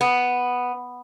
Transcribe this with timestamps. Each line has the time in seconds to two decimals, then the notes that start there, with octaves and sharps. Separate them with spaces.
0.01 B3